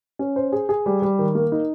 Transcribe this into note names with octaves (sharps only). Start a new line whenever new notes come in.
C#4
C5
G#4
G#4
G3
G3
D#3
A#3
D#4